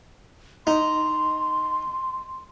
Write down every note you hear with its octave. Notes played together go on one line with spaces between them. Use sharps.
D#4 C6